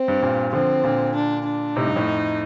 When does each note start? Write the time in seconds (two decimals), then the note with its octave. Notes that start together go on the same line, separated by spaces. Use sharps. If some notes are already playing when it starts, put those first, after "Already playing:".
Already playing: C4
0.08 G2
0.23 G2 A#2
0.53 D3 F3 C4
0.84 A#2 D3
1.15 D4
1.45 D4
1.76 A2 C3 D#4
1.87 G2
1.96 F2 A2